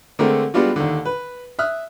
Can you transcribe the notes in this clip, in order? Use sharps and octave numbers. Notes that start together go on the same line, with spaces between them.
D3 G#3 A3 C4 A#4
G3 G#3 B3 D4 F4 F#4
D#2 D3
B4
E5 D#6 F6 F#6